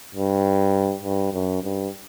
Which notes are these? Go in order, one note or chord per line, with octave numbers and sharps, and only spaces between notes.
G2
G2
F#2
G2